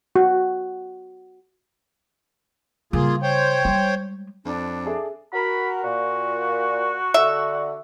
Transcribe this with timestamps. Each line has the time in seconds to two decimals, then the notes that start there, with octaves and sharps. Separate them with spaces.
0.16 F#4
2.93 C#3 G3 A#3 F4 G#4
3.22 C5 C#5 G5
3.65 G3 G#3
4.45 F2 D4
4.86 G#4 A4 E5
5.33 F#4 A#4 B5
5.83 A#2 F#4
7.14 D3 E5